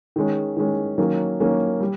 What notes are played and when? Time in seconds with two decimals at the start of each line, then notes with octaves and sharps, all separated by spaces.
0.16 D#3 G#3 C#4
0.57 D#3 G#3 C#4
0.98 D#3 F#3 A#3 C#4
1.40 D#3 F#3 A#3 C#4
1.80 G3